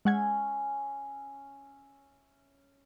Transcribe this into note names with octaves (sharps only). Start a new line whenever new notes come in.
G#3 C#4 E5 F#5 G#6